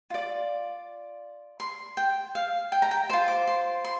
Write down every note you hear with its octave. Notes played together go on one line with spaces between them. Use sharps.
F4 D5
C6
G5
F5
G5
A#5
G5
F4 C5 C6
D6
C6
C6